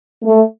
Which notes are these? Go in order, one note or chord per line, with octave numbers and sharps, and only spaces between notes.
A3